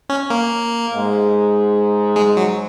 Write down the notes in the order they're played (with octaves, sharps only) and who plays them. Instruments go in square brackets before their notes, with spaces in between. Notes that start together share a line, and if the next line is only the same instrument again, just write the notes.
[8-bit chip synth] C#4
A#3
[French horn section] G#2
[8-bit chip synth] G#3
F#3